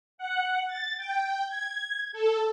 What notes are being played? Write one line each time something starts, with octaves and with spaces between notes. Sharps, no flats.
F#5
A6
G5
G#6
A4